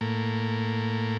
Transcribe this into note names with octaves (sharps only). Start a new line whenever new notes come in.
A2 A#3